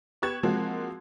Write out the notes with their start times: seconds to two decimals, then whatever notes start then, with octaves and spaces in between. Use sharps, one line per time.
0.22 B3 G4 C#6 F#6 G#6 E7
0.43 F3 F#3 G#3 A#3 C4 F#4